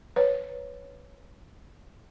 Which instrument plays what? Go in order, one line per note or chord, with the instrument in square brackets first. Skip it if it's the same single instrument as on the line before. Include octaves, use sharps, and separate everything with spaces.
[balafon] B4 C#5